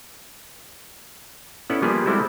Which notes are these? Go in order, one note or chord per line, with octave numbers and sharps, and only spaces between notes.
B3 C#4 E4 A4 D5 F#5
F3 G3 A#3 B3 G4 G#4
G3 G#3 C4 E4 F#4 A4